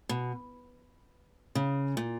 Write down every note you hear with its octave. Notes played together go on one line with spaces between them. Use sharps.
B2
C#3
A#2